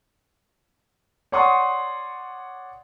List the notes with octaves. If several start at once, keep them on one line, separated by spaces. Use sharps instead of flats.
C#5 D5 F#5 C6 C#6 D#6